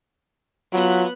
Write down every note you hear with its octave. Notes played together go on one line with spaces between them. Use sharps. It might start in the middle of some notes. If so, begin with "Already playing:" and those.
F#3 B3 F4 F#6